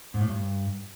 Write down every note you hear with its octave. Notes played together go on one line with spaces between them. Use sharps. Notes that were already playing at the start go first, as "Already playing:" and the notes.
G#2
A2
G2